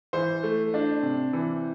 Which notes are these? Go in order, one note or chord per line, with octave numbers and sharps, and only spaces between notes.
E3 C5
A3
D4
C3
E3